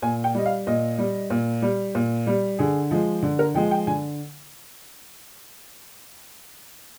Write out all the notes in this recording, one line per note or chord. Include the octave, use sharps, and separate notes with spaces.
A#2 G#5
G5
G3 D#5
F5
A#2 D#5
G3
A#2
G3
A#2
G3
D3 G#4
F3 G#3
D3
A#4
F3 G#3 G5
G5
D3 G#5